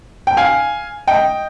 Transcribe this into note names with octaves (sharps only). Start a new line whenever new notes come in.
G5
F5 G#5
D#5 G5